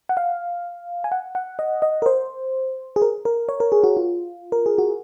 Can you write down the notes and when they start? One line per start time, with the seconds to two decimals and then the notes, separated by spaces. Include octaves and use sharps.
0.09 F#5
0.17 F5
1.04 G#5
1.12 F#5
1.35 F#5
1.59 D#5
1.82 D#5
2.02 A#4
2.06 C5
2.96 G#4
3.02 A#4
3.25 A#4
3.49 C#5
3.60 A#4
3.72 G#4
3.84 F#4
3.97 F4
4.52 A#4
4.66 G#4
4.78 F#4